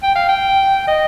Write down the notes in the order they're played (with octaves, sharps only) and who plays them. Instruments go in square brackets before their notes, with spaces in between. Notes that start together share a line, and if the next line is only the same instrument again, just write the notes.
[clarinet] G5
F5
G5
D#5